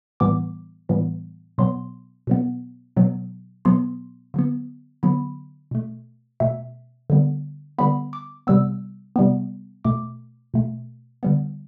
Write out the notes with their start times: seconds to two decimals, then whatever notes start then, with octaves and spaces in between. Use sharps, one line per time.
0.20 A2 E3 G3 B3 D6
0.89 A2 E3 G3 B3
1.58 B2 F#3 B3 C6
2.27 B2 F#3 B3
2.96 B2 F#3 B3
3.65 B2 F#3 B3 C6
4.34 D3 F#3 B3
5.03 D3 F#3 B3 B5
5.71 B2 A3
6.40 B2 A3 E5
7.10 D3 G3 B3
7.78 D3 G3 B3 B5
8.13 D6
8.47 C3 G3 B3 E6
9.16 C3 G3 B3
9.84 B2 A3 D6
10.54 B2 A3
11.23 D3 G3 B3